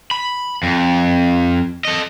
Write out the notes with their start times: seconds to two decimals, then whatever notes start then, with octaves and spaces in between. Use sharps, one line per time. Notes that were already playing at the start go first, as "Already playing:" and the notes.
0.11 B5
0.63 F2
1.85 A4 D#5